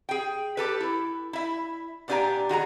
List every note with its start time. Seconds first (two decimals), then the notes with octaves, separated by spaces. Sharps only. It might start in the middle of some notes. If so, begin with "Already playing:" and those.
0.09 G#4 G5
0.57 G4 A4 B4
0.80 E4
1.33 E4 E5
2.08 A#2 B3 D4 G4 G#5 A#5
2.49 D#3 F#4 G#4 A#5